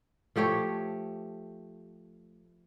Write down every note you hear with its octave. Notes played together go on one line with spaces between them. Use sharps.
F3 A3 G4 C#5